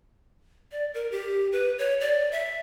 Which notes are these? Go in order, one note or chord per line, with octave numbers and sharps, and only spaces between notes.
D5
A#4
G4
B4
C#5
D5
E5